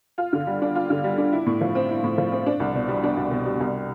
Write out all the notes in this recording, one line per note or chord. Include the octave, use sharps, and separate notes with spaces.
F4
D3
G3
D4
F4
D3
G3
D4
E4
A2
F3
C4
E4
A2
F3
C4
D4
C2
B2
G3
D4
C2
B2
G3
C2